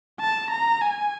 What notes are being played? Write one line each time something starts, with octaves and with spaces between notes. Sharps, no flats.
A5
A#5
G#5